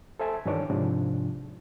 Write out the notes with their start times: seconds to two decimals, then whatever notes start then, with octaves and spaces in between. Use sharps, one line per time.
0.20 A4 C5 E5 G#5 A5
0.46 G2 D#3 E3 D4 C#5 D6
0.70 G#2 C3 F3 D4